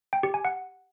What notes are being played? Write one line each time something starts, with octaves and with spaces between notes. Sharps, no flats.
G5
G4
G#5
F#5